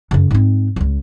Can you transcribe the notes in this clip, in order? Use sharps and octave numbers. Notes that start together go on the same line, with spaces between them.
F#2 C#3
G#2 C4
D#1 C#2